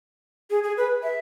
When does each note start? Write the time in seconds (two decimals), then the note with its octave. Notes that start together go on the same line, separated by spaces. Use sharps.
0.50 G#4
0.63 G#4
0.77 B4
1.03 E5